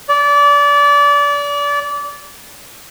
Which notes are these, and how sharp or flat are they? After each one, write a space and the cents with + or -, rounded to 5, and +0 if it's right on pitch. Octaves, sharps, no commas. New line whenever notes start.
D5 -30